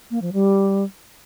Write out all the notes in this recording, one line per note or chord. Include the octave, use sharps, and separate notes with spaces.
A#3
F3
G3